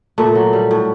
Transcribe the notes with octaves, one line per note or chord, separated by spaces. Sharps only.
A#2 A3
F#3
G3
A2